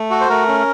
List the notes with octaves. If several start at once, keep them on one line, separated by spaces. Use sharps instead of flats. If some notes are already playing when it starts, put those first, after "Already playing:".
Already playing: A3
F#4 A4
C5
A3 A#4
C#4